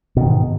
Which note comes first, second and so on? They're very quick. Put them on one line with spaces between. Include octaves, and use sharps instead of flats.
B2 D#3 G#2